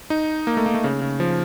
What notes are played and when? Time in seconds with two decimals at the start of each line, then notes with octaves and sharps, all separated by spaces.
0.10 D#4
0.47 A#3
0.57 A3
0.66 A#3
0.74 A3
0.84 C#3
1.01 C#3
1.20 F3